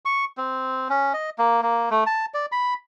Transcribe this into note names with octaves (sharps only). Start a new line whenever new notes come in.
C#6
C4
C#4
D#5
A#3
A#3
A3
A5
D5
B5